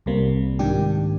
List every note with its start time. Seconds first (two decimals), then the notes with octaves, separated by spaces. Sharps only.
0.06 C2 C3 G3 A#3
0.59 G#2 D#3 A#3 D4 G4